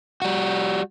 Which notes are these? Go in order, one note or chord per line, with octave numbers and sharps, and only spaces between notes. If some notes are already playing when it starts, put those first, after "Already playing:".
G3 F#4